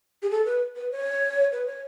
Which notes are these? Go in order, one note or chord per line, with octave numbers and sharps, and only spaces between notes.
G#4
A4
B4
B4
C#5
B4
C#5